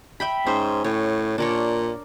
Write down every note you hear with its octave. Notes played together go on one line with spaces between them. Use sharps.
E5 G5 B5
G#2 C#4 C5
A2 C#5
A#2 D4 A#4 C#5